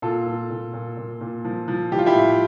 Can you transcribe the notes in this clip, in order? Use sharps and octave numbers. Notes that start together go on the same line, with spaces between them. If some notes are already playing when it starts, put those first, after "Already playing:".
A#2 F4 A4
A#2
A#2
A#2
A#2
A#2
F3
F3
E3 G4
F4
E4 G4
A2